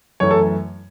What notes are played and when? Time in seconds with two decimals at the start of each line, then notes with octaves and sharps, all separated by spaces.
0.20 F#2 E3 A3 C#5
0.31 A4